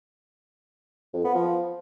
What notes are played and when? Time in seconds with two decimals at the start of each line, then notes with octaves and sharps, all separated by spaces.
1.14 F2
1.24 B3
1.35 F3